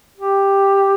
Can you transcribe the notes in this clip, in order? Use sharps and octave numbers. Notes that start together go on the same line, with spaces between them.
G4